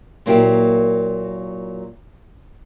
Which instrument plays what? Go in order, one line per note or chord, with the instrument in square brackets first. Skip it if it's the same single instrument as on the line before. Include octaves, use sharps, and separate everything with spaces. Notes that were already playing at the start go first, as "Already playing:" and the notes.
[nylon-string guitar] A#2 F#3 A#3 E4 G4